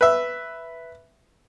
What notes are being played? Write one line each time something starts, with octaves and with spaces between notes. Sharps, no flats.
B4 E5